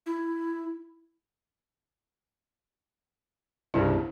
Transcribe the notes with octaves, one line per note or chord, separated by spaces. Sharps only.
E4
C2 G2 C#3 E4